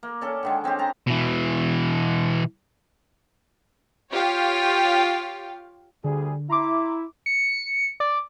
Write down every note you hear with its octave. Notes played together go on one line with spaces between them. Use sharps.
A#3
C#4 A4 D5
D3 D#3 G#3
G#3 C4 C#4 G4
A5 A#5 C6
B2 E3
F4 G4 C#5 F5 G5
D2 D3 G3 G#4
E4 A#5 C6 D6
C#7
D5